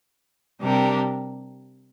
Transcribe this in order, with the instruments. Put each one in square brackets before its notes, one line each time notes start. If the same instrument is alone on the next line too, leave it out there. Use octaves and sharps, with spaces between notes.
[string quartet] C3 G3 D4 G4 A#4